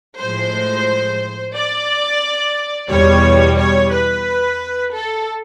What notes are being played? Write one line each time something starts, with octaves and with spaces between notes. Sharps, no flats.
A2 F3 G#3 C5
D5
E2 B2 G3 C#5
C#5
B4
A4